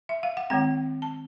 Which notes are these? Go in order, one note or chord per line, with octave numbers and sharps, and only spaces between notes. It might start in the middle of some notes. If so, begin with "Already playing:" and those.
E5
F5
F#5
D#3 G#3 C4 G5
A5